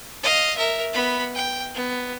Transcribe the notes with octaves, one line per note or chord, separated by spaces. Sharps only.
D#5 F5
A#4 E5
B3 B5
G5
B3